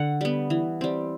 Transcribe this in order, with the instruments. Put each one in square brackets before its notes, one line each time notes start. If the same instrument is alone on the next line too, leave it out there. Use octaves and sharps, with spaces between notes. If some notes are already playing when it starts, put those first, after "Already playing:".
Already playing: [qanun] D3 F#5
G3 B3
E3
G3 C4